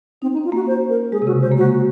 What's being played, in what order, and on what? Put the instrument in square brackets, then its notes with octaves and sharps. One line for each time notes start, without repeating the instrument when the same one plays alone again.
[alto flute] C4 [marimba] D#4
[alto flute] D#4
[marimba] C#4
[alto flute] F4
[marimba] A#3 [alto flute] F#4
[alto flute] C5
A#4
[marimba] G#3 [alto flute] G#4
[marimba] C3
[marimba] C#3 [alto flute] F#4
[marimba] G#3 [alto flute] C5
[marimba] A#3
[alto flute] F#4
[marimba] G#3